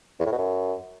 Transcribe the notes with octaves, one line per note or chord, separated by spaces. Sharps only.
E2
A2
B2
F#2